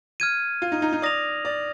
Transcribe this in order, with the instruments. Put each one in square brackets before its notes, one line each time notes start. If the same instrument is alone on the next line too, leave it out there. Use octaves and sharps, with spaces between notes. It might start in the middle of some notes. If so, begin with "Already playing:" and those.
[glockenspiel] F6 G#6 D#7
[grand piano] F4
D#4
D#4
D#4
[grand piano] D5 [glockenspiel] D#6 A#6 F7
[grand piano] D5